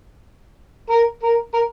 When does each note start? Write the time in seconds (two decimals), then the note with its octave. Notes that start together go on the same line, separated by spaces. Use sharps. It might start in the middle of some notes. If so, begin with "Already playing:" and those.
0.90 A#4
1.23 A#4
1.54 A#4